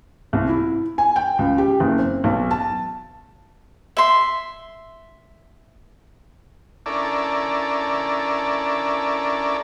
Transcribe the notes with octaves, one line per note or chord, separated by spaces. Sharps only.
C2
E4
G#5
G5
C#2
G4
F#1
C4
B1
A5
E5 C6
C#4 D4 E4 A4 A#4 D5